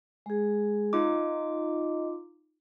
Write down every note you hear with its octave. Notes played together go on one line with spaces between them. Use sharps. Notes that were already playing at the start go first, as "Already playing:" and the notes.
G#3 G#4
D#4 F4 D#5 D6